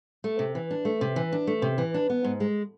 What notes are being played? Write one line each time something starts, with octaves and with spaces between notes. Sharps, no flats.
A3
C3
E3
D4
A3
C3
E3
D4
A3
C3
E3
D4
B3
G#2
G#3